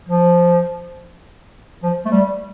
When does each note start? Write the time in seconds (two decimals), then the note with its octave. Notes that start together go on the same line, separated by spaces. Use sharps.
0.09 F3
1.83 F3
2.05 A3
2.12 G3